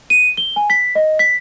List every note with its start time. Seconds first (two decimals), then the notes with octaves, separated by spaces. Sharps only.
0.10 D#7
0.37 G7
0.56 G#5
0.70 B6
0.95 D#5
1.19 B6